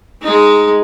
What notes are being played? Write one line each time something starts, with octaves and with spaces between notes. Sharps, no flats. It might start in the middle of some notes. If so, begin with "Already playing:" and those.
G#3 D#4